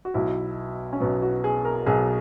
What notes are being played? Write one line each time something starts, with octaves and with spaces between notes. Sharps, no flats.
F#4
B1 B2 F#3 E4
C#4
B1 B2 F#3 B3
F#4
G#4
A#4
B1 B2 F#3 G#4